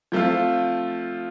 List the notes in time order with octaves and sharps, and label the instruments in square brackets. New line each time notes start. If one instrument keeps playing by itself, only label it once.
[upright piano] F3 A3 C4 F4